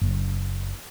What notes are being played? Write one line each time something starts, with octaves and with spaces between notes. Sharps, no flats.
F#1